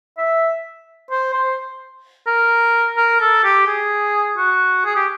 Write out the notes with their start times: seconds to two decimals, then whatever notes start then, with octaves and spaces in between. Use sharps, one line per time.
0.18 E5
1.11 C5
1.34 C5
2.27 A#4
2.97 A#4
3.21 A4
3.44 G4
3.67 G#4
4.37 F#4
4.85 G#4
4.96 G4